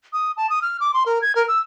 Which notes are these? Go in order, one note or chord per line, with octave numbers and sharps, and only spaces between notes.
D#6
A5
D#6
F6
D6
C6
A#4
G#6
A#4
E6